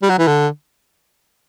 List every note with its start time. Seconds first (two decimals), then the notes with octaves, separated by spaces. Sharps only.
0.02 G3
0.10 F#3
0.18 E3
0.27 D3